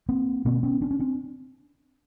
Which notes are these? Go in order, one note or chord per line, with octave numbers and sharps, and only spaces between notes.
A#3 C4
B2 A#3 C4
B3 C#4
C4 D4
C#4
C4 D4